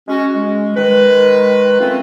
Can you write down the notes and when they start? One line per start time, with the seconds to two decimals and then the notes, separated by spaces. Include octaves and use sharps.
0.08 G#3 C#4 F#4
0.34 G#3
0.76 D#3 G#3 B4
1.80 A3 A#3 C4 C#4 F4